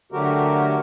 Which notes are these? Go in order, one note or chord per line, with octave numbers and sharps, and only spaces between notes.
D3 F#3 A3 F#4 G4 A#4